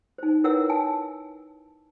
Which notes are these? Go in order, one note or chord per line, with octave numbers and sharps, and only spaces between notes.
D#4 C5
E4 A#4 B4 C#5 F#5 E6
G#5 A5